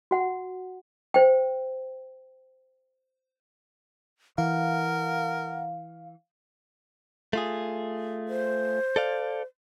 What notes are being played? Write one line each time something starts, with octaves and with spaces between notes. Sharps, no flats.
F#4 F#5
C5 G5
E3 A#4 F5 F#5
A3 F4 G#4
C5
A4 D5 F5